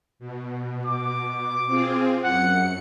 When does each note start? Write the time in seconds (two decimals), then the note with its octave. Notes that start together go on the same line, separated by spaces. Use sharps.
0.19 B2
0.86 D6
1.67 C4 F4 G#4
2.24 F#2 F#5 C#7